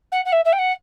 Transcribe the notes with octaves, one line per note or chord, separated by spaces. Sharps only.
F#5
F#5
E5
E5
G5
F#5